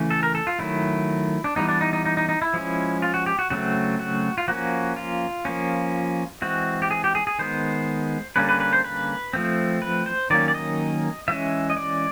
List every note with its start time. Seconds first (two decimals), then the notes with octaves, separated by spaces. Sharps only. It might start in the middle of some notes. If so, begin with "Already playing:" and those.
Already playing: C#3 E3 A3 C#4
0.11 A4
0.23 A#4
0.35 A4
0.47 F4
0.59 D#3 F#3 A3 E4
1.44 D4
1.56 E3 G3 B3 D#4
1.68 D4
1.81 D#4
1.93 D#4
2.05 D#4
2.17 D#4
2.29 D#4
2.42 E4
2.54 F3 G#3 C#4
3.02 F4
3.14 F#4
3.26 G4
3.39 F#4
3.50 C#3 F#3 A3 C4 F#4
3.99 F#4
4.38 F4
4.48 F3 A#3 C#4 F#4
4.96 F4
5.45 F3 A#3 C#4
6.42 E3 G#3 C4 F#4
6.82 G4
6.91 G#4
7.04 G4
7.15 G#4
7.27 G#4
7.39 D#3 G#3 B3 C5
8.36 D3 G3 A#3 C#4 B4
8.49 B4
8.60 B4
8.73 C5
8.84 B4
9.33 F3 A3 C4
9.82 B4
10.06 C5
10.30 D#3 F#3 A#3 C#4 D5
10.48 D5
10.54 D#5
11.28 E3 G#3 C#4 E5
11.70 D#5
11.77 D5